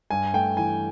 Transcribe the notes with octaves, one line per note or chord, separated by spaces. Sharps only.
G2 G#5
A3 G5
E3 G#5